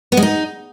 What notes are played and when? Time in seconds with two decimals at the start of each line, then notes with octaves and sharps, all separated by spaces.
0.12 B3
0.17 G#3
0.23 D#4